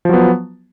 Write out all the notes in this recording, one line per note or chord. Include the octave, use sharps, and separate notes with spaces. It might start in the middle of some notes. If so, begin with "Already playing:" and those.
F3 F#3 B3